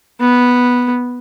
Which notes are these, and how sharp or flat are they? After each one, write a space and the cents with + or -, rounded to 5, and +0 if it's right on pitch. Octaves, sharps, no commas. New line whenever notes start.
B3 -5